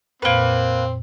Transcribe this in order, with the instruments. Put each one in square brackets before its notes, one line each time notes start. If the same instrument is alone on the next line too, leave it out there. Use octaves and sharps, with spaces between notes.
[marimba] F2 A#2 [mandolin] A#3 B4 [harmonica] C4